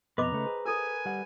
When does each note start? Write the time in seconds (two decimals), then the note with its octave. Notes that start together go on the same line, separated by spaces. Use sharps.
0.18 F2 B2 B3 B4 D#5 A#5 C6 D6
0.32 C#3 A3
0.45 G#4 C5
0.65 A4 A#4 G#5
1.05 G3 F#5